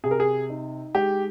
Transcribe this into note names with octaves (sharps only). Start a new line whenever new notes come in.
C3 G#4
A#4
G#4
D#4
G#3 G4